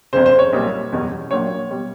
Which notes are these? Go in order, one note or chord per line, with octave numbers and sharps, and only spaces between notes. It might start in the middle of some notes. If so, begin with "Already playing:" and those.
G1 F2 C#3 C5
C5
C#5
B1 A#2 G3
F#1 E2 B2 G3
A#1 A#2 F#3 C#5
B2 G3